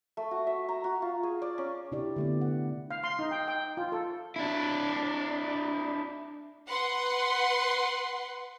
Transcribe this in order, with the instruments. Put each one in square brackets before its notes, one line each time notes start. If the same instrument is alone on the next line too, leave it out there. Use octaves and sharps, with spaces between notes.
[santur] A3
F#4
E5
A#5
F#4
F4
G#4
D5
C#4
[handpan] C3 D4 E4 G4 D5
D3 A3 B3
F#5
[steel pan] F5
C6
D#4
G5
G5
F4
A4
[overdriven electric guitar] D4 E4
[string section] B4 F#5 C6